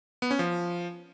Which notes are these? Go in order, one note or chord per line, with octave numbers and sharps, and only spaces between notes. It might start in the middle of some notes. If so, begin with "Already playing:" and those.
B3
C#4
F3